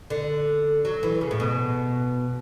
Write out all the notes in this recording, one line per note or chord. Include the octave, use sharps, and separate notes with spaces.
D3
F#3
E3
C#3
A2
B2